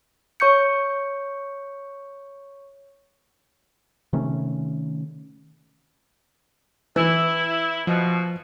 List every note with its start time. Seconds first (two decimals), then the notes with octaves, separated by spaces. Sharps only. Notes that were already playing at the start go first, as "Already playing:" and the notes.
0.40 C#5 C#6 G6 C#7
4.13 C3 D#3 A3 C#4
6.96 E3 E4
7.87 B2 F3